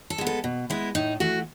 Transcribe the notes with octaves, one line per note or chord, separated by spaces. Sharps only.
A4
G#3 B3
A4
B2
G#3 B3 E4
A2 D#4
E3 A3 F#4